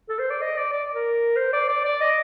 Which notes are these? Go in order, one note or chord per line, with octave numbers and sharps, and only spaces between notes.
A4
C5
D5
D#5
D5
D5
A#4
C5
D5
D5
D5
D#5